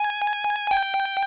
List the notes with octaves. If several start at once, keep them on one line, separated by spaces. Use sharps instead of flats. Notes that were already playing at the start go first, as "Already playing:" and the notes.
Already playing: G#5
G5